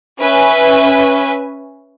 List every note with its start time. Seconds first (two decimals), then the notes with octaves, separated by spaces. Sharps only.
0.20 C#4 B4 E5 G#5